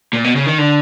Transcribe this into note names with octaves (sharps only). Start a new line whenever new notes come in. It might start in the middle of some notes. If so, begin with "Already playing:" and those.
A#2
B2
C#3
D#3
D3